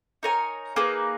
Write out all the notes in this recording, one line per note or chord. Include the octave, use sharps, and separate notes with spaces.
D#4 A#4 C#5 G#5
A#3 D#4 G#4 B4